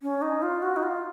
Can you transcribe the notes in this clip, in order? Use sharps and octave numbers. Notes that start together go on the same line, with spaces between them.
C#4
D#4
F4
F#4
D#4
F4